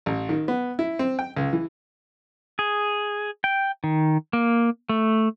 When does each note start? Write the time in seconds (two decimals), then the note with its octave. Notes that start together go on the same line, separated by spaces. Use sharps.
0.06 A1
0.29 D#3
0.48 B3
0.79 E4
0.99 C4
1.19 G5
1.37 C#2
1.53 E3
2.59 G#4
3.44 G5
3.84 D#3
4.33 A#3
4.89 A3